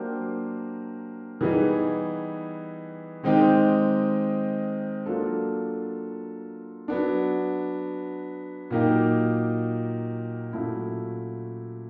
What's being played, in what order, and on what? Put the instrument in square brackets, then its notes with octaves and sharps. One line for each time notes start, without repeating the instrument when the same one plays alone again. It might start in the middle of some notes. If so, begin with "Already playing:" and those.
Already playing: [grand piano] F#3 A#3 D4 G4 C5
E3 G3 B3 D#4 G#4
D#3 G#3 C4 D#4 G4
F#3 A#3 D4 F4 A4
F#3 B3 D4
A#2 F#3 A#3 D#4 G4
A#2 F#3 A3 C#4 E4